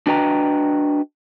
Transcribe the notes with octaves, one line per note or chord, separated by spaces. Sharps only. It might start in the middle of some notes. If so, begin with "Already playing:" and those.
D4 F#4 B4 D#5 G5 A#5